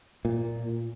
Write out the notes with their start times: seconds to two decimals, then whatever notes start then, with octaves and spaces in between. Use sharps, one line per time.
0.25 A#2